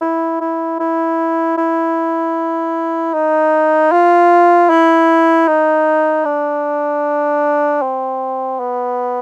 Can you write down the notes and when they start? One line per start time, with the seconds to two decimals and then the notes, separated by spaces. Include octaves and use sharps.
0.01 E4
0.41 E4
0.80 E4
1.57 E4
3.13 D#4
3.92 F4
4.70 E4
5.48 D#4
6.25 D4
7.82 C4
8.60 B3